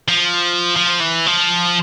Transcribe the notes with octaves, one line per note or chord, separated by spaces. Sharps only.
F3
F3
E3
F3